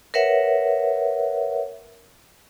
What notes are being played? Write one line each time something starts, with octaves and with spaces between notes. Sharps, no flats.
A#4 B4 C#5 E5 F#5